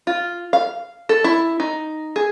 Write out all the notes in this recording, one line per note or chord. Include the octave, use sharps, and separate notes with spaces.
F4
F5
A4
E4
D#4
G#4